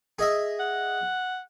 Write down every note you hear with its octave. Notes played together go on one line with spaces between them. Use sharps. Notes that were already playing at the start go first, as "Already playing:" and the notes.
G#4 D#5 E5
F#5